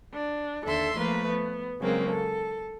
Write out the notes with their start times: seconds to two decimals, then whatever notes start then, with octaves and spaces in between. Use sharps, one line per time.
0.14 D4
0.65 D#2 D3 A4 E5 C6
0.97 F3 A3 A#3 B4
1.28 B3
1.79 C#3 F#3 G#3 A#3 C4
2.09 A4